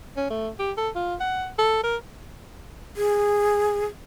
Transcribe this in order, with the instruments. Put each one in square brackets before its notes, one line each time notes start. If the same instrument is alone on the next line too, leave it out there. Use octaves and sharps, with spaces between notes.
[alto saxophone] C#4
A3
G4
A4
F4
F#5
A4
A#4
[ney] G#4